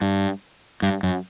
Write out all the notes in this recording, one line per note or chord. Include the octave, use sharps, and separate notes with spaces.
G2
G2
F#2